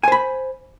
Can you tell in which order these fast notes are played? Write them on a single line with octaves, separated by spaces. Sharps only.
G#5 C5 B5